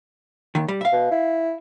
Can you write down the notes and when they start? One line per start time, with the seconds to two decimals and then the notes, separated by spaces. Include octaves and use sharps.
0.55 D#2 D#3
0.68 G3
0.81 E5 F5
0.92 B2
1.11 E4